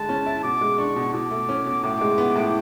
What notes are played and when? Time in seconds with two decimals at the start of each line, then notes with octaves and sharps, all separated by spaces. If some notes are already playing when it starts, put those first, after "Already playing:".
Already playing: D3 G#3 A5
0.09 C#4
0.26 E4
0.43 B2 D6
0.61 G#3
0.78 D4 C#6
0.96 B2
1.14 B2 D6
1.31 A3
1.49 C#4
1.66 B2
1.84 A2 D6
2.01 G#3
2.18 B3
2.36 A2